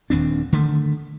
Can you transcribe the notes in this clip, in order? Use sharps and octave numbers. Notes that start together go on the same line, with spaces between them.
D#1 D#2 C4 D4
D3 D#3 A3